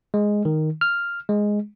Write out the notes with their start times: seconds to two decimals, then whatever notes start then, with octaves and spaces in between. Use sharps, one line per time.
0.14 G#3
0.45 D#3
0.81 F6
1.29 G#3